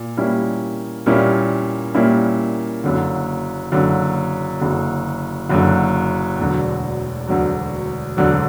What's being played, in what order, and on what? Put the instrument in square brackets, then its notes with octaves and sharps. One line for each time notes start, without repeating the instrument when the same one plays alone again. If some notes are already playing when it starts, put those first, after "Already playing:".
Already playing: [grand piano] A#2
A#2 G3 A#3 C#4 E4
A#2 G3 A#3 C#4 E4
A#2 G3 A#3 C#4 E4
F#1 F#2 D3
F#1 F#2 D3
F#1 F#2 D3
F#1 F#2 D3
E1 D2 D3 F#3
E1 D2 D3 F#3
E1 D2 D3 F#3